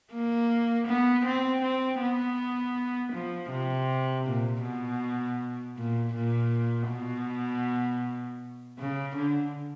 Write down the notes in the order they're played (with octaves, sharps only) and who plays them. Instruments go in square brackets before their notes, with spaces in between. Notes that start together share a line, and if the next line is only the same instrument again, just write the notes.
[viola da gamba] A#3
B3
C4
C4
B3
F3
C3
A#2
B2
A#2
A#2
B2
C#3
D3